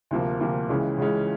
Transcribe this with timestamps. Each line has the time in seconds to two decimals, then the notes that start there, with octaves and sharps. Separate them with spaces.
0.11 D2 C3 F3 A#3
0.40 D2 C3 F3 A#3
0.69 C#2 C#3 E3 G#3 C#4
0.98 C#2 C#3 E3 G#3 C#4